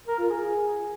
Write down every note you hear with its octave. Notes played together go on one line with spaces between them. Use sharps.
A#4
F4
G#4